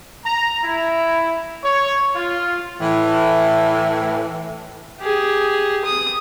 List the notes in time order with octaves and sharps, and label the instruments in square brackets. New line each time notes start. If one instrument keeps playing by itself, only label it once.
[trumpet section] A#5
E4
C#5
F4
[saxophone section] A2 E3
[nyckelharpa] G4 G#4
D#6